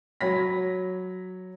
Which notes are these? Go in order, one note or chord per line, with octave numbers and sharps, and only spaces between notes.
F#3 C#5 B5 A#6 B6